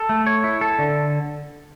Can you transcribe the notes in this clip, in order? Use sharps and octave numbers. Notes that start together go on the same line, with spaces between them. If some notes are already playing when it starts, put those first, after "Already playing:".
Already playing: A4
A3
C#5
E4
A4
D3